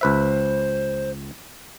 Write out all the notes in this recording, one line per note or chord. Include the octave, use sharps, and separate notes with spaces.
C#2 B4 C5 E5